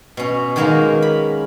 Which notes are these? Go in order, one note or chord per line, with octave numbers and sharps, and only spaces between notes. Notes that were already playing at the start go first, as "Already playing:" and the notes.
B2 C#4
D#3 F#3 G#3 A#3 C#4 A#4
B5